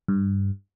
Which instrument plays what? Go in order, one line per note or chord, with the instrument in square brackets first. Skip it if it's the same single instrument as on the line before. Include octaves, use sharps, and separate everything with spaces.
[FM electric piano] G2